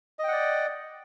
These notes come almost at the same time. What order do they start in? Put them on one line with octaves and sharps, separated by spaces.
D#5 G5 F#5 D5